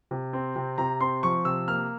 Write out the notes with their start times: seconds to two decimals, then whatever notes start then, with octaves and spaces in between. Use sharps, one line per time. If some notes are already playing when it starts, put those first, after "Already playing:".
0.11 C3
0.33 C4
0.56 C3
0.78 C3 A#5
1.01 C4 C6
1.23 F3 C#6
1.45 C3 E6
1.68 A#3 F6